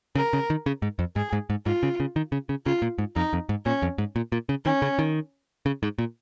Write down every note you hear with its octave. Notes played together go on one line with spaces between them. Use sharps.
C#3 A#4
C#3
D#3
C#3
G#2
F2
G#2 G#4
G#2
G#2
G#2 F4
C#3
C#3
D#3
C#3
C#3
C#3 F4
A#2
G#2
F2 D#4
F2
G#2
A#2 C#4
F2
G#2
A#2
A#2
C#3
D#3 C#4
C#3
D#3
C#3
G#2
A#2